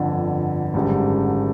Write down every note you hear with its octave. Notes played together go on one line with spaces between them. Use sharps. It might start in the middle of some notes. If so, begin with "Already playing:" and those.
Already playing: G1 F2 D3
G#1 F#2 D3 G3